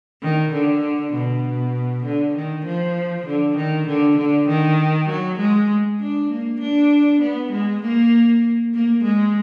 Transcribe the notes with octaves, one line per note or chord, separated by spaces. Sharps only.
D#3
D3
B2
D3
D#3
F3
D3
D#3
D3
D3
D#3
F#3
G#3
D4
A#3
D4
B3
G#3
A#3
A#3
G#3